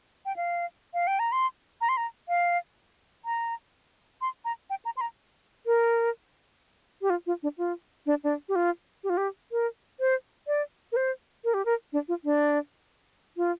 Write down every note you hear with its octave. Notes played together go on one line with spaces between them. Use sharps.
G5
F5
F5
G5
A#5
C6
A#5
C6
A#5
F5
A#5
C6
A#5
G5
A#5
C6
A#5
A#4
G4
F4
F4
D4
F4
D4
D4
G4
F4
G4
F4
G4
A#4
C5
D5
A#4
C5
A#4
G4
A#4
D4
F4
D4
F4